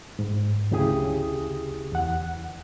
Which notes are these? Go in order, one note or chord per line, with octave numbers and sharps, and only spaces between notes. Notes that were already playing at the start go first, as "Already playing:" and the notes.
G#2
D2 C#3 E4 G4 G#4 D#6
E2 F#5